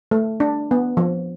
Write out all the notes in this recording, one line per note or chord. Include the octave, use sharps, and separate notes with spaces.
A3
D4
B3
F3